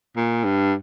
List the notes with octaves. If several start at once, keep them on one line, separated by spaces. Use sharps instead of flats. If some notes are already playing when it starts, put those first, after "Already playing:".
A#2
G2